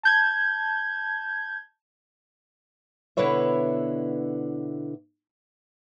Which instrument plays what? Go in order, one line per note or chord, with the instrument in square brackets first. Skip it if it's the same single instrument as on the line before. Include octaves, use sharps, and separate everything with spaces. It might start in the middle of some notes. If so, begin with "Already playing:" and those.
[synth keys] A5 G6 G#6
[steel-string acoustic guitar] B2 D3 E4 B4 C#5 E5